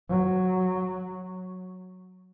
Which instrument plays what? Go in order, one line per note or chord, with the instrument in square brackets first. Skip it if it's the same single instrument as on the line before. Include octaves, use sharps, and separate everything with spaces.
[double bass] F#3